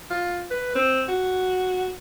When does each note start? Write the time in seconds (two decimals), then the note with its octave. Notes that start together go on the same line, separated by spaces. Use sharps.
0.10 F4
0.50 B4
0.75 C4
1.08 F#4